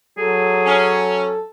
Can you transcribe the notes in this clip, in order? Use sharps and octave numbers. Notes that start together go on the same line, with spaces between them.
F#3 G#4 A4
C#4